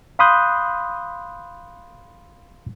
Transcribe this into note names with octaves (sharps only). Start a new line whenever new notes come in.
F5 B5 C6 D#6 F#6 G6